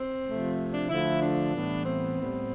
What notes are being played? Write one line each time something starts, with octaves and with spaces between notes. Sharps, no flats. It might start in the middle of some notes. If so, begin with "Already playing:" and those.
Already playing: C4
C3 F3 A3
D4
D3 F3 A3 E4
D4
A2 E3 G3 B3
C4
A2 G3 B3